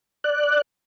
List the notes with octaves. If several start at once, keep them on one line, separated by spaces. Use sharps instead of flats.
D5 F#6